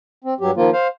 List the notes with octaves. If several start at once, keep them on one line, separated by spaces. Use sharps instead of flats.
C4
G2 F#3 G4
D#3 F3 A#3 F4
C5 F5